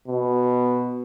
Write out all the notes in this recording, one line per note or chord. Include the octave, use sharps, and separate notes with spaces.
B2